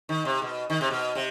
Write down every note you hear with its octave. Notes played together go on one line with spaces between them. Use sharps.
D#3
C3
B2
D#3
C3
B2
C3